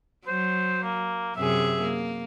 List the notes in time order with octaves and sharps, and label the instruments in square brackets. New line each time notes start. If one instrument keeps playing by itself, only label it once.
[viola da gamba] F#3 [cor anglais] C5
[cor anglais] A#3
[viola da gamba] F#2 C3 G#4 [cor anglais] E5
[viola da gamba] A#3